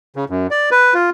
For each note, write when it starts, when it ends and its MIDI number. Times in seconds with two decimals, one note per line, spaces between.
0.16 0.25 49
0.30 0.47 42
0.51 0.70 74
0.71 0.94 71
0.94 1.10 65